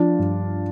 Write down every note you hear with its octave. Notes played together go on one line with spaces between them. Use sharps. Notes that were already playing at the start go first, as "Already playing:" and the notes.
Already playing: F3 D4 F4
G2